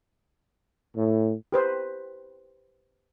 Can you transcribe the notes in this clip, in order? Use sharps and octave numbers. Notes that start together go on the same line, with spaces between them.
A2
G4 B4 C5